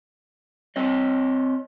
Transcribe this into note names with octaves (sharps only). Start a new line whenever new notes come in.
C4 C#5 D#5